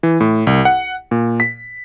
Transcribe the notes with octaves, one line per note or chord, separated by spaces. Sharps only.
E3
A2
C2
F#5
A#2
B6